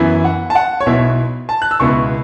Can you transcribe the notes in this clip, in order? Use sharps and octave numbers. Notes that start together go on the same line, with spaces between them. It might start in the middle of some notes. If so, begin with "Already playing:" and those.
Already playing: F#2 E3 B3 E4
F#5
A5
F#5
C#5
B1 B2 B3 E4 E5
A5
F#6
E6
C#2 B2 B3 E4 C#6